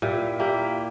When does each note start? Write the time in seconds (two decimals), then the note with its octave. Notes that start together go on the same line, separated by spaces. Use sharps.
0.02 A#2 E4 G4
0.39 A#3 E4 G4